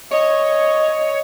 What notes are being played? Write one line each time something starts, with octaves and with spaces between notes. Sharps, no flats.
C#5 D#5